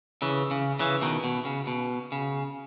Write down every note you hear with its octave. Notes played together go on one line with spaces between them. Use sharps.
C#3 E3
C#3
C#3 E3
B2 D#3
B2
C#3
B2
C#3